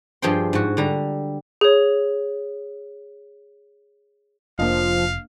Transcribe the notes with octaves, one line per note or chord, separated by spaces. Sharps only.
G2 F3 G#4 C5 G5 C6
G#2 F#4
D3 G3 A#5
G#4 C#5
F1 F3 A#3 D4 D#5 F5